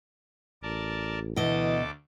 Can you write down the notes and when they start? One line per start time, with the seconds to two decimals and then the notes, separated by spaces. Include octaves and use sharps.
0.63 A1 A#4 D5 A5
1.36 D2 B2 E3 A4 D#5 D6